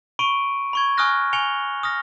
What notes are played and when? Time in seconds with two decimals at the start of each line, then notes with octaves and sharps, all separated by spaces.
0.19 B5 C#6 D7 D#7
0.73 B5 C#6 G#6
0.97 G#5 C#6 D#6 F6 F#6 A#6
1.33 G#5 C#7 F7 G7
1.83 D#6 F6 A#6